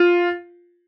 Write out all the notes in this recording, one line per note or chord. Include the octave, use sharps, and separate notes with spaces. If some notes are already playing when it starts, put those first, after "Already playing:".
Already playing: F4